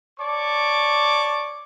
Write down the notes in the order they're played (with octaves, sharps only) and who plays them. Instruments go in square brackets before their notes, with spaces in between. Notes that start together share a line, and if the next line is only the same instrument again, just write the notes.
[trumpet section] C#5 D5 A5 C#6 D6